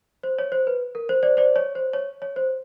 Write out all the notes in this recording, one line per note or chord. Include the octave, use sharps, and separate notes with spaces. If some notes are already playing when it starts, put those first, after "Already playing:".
C5
C#5
C5
B4
A#4
C5
C5 D5
C5 D5
C#5
C5
C#5
C#5
C5